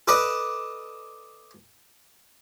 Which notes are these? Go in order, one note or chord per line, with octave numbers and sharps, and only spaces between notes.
A4 B4 D5 D#5